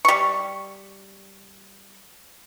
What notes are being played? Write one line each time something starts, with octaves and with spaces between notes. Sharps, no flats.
G3 C#6